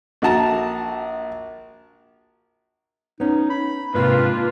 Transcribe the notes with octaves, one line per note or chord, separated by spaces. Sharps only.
A#1 F#4 A5 A#5
B3 C#4 D#4
B5
G#2 C3 A#3 D4 F4 B4